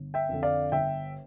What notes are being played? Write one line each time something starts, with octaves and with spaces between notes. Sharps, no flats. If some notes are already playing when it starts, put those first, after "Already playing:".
Already playing: G1
E5 G5
F2 D3
D5 F5
G1 E5 G5